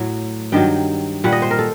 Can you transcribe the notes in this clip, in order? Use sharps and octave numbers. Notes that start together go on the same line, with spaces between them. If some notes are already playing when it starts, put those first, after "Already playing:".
Already playing: A2 F#3
G2 D#3 F#3 G5
A#2 G3 F#5
D#5
C5
A#4
A4